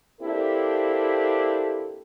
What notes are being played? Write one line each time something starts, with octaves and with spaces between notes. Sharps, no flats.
A#3 C4 D4 E4 G4 A4